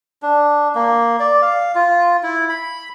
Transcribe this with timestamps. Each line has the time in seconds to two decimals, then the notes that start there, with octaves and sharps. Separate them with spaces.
0.22 D4
0.75 A#3
1.20 D5
1.42 F5
1.75 F4
2.23 E4
2.49 B5